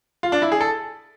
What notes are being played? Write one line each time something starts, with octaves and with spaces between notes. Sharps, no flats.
F4
D4
E4
G#4
A4